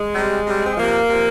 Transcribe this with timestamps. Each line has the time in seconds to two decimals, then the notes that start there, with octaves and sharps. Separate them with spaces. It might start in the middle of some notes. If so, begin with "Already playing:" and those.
Already playing: G#3
0.15 C3 G3
0.45 C3 G3
0.66 C4
0.77 C3 F3 A#3
1.09 C3
1.14 F3